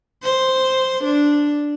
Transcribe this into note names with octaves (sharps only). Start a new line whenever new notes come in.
C5
D4